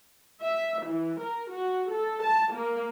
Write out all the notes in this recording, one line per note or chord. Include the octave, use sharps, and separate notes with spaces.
E5
E3
A#4
F#4
A4
A5
A#3